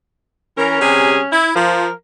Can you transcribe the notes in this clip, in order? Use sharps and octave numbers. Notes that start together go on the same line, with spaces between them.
E3 C#4 A#4
C3 G3 G#4
E4
F3 A#4